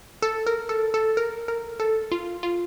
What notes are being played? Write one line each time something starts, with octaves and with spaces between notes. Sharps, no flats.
A4
A#4
A4
A4
A#4
A#4
A4
F4
F4